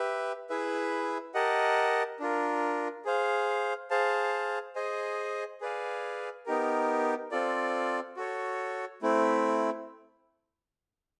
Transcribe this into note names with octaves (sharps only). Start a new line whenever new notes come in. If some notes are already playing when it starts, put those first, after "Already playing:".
Already playing: G4 B4 E5
E4 G#4 B4 E5
G4 A#4 D#5 F#5 A5
D4 F4 A#4
G#4 C5 F5
G#4 C5 F5 A5
G#4 C5 D#5 G#5
G#4 B4 D5 F5 G#5
B3 D#4 G4 A#4
C4 F4 A4 D5
F#4 A4 C#5
A3 C4 E4